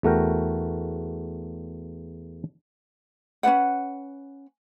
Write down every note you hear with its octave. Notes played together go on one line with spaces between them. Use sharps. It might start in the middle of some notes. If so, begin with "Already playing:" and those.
E2 A3 F#4 A#4 G5
C#4 D4 B4 F#5